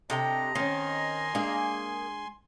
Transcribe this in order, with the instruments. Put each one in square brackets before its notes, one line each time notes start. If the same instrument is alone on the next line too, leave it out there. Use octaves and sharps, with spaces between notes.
[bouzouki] C3 A4 G5 [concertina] D4 [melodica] D#5 A#5
[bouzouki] D#3 [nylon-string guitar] C4 C#4 [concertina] G#5 C6
[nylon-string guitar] G#3 D4 [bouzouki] A#3 G#4